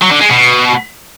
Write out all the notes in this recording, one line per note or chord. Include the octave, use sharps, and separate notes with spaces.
F#3
D3
G#3
B2